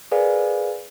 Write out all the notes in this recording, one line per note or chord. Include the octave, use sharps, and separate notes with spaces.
G#4 A#4 B4 D5 F5 G#5